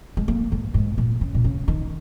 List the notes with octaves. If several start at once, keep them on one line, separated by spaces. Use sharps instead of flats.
G#3
A#3
G#2
G#2
A#2
C#3
A#2
C#3
D#3